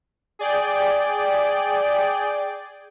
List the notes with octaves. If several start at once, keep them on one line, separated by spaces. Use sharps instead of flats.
G#4 D5 G5